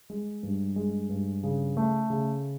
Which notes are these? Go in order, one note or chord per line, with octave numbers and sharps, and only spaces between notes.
G#3
G2
G#3
G2
C#3
A3
C#3